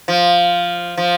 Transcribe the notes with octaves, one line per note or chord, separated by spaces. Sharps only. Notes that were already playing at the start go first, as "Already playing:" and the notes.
F3
F3